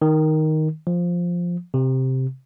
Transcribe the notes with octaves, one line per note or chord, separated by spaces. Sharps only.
D#3
F3
C3